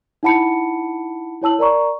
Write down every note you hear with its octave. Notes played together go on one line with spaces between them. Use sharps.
D#4 E4 F#5 A5 B5 C#7
E4 C#5 A5 E6 F#7
A#4 D5 A#5 C#6